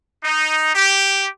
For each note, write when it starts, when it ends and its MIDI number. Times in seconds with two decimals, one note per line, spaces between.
0.24 0.73 63
0.74 1.26 67